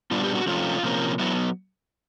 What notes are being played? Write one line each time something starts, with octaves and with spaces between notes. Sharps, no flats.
A#2 G3 B3 D4 F4
G4
F#4
C3 F3 A3 C#4 F4
C3 F3 A#3 C#4
F#3 B3 E4